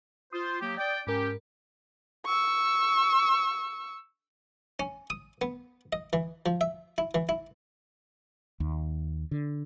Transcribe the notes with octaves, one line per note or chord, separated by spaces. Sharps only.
F4 C5 D#6
F#3 A#3 G4
D5 G5
G#2 C#4 G4 A#4
C#6 E6
C#4
D#6
B3
D#5
E3
F3
E5
E4
E3
E4
D#2
D3